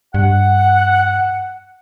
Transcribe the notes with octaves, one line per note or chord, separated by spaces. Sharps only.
G2 F#5